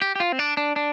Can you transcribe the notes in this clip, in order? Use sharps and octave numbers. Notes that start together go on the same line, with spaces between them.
G4
G4
F4
C4
D4
D4
D4